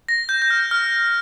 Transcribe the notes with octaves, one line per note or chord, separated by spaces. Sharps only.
A#6
G6
G6
F6
F6